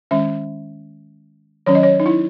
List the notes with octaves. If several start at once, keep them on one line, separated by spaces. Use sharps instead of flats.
D#3 G#3 C#4 E5
D#3 F#3 C#4 C#5
D#5
C#5
D#4
E4